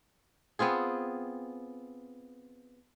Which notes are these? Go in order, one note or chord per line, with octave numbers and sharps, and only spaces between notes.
B3 C4 F4 G#4